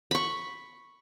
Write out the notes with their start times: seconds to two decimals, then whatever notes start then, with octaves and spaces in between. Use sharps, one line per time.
0.11 B5 C#6